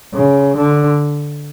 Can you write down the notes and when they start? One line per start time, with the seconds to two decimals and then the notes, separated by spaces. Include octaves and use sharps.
0.14 C#3
0.57 D3